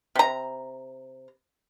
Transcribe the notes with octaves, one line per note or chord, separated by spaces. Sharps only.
C3 A#5